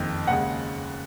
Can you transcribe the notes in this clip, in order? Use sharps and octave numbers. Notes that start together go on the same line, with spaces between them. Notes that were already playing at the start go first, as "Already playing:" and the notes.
Already playing: F#1 F2 D#3
D#2 C#3 G#3 F#5